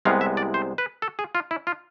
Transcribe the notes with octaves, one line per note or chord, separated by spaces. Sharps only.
C2 C3 G#3 B3 F5
E5
D5
C5
B4
A4
G#4
F4
E4
F4